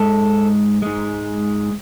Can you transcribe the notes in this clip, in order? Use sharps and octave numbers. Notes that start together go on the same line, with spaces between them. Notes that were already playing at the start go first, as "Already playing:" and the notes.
Already playing: G#2 G#3 A4
G#2 G#3